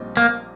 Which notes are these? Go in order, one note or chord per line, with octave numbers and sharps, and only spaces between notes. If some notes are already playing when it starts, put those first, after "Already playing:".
Already playing: A#1 A#2 G3 C4 D#4
A#3